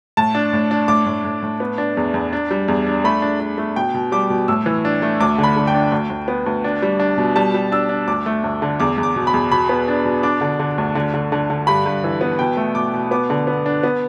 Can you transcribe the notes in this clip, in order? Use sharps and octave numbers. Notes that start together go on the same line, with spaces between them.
A2 A5
D4
A2
D4
A2 D6
A2
A2
A2
B3
D4
E2
E2
D4
G3
E2
D4
A3 B5
D4
D4
A3
B2 G5
B2
G3 D6
B2
A2 E6
E3
D4
A3
D2 D6
D3
B5
D3
G5
D4
D2
D2
B3
D2
D4
G3
D4
B2
G3 A5
G3
D4 E6
D4
D2 D6
A3
D2
D3
E2 D6
E2
D6
B2
B5
E2
B2 B5
B3
D4
B2
D4 D6
D3
D3
D2
D3
D3
D3
D3
G2 B5
G2
E3
B3
B2 G5
A3
B2 D6
B2
B3 D6
D3
B3
D4
B3